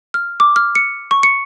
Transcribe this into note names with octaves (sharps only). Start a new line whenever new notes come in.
F6
D6
F6
C#7
C#6
C#7